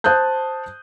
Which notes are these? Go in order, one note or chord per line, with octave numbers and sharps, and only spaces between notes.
C5 A5 D#6 F#6 G6